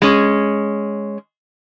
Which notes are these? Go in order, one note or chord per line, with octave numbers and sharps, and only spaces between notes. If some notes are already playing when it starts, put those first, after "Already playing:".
G#3 C#4